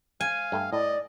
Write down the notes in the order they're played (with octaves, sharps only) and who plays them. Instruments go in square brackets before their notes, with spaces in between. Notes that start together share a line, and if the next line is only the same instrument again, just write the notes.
[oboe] F5 [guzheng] G#5
[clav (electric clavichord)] G2 A3 G5
[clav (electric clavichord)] A2 [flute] D5 [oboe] D#5